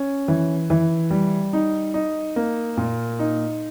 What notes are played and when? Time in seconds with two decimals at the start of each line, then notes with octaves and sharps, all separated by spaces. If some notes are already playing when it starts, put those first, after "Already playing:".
Already playing: C#4
0.28 E3
0.70 E3
1.11 G3
1.53 D#4
1.94 D#4
2.36 A#3
2.77 A#2
3.19 D#4